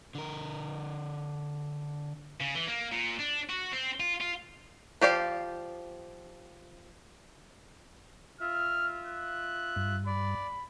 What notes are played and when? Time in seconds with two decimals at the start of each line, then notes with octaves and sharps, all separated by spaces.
0.15 D3 A#4
2.41 C#3
2.55 E3
2.68 A#3
2.92 A#2
3.20 D4
3.50 F#4
3.72 C4
4.00 F4
4.21 F4
5.01 F3 G4 D5 F5
8.41 F4 E5 F6
9.06 F#6
9.76 G2
10.07 D5 B5